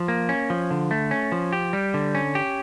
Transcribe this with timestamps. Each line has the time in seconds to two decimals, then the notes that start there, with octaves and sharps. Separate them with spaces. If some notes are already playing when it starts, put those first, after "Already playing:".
Already playing: F3
0.08 A#3
0.29 C#4
0.50 F3
0.71 D3
0.91 A3
1.11 C#4
1.32 F3
1.53 G4
1.73 G3
1.94 D3
2.15 C#4
2.35 G4